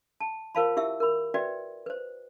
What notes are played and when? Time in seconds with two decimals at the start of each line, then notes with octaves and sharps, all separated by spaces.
0.20 A5
0.55 F4 A#4 C5 F5 A5 B5
0.77 E4 G4 E5 E6
1.00 A#4 B5
1.34 F#4 B4 D5 E5 G5
1.86 B4 C5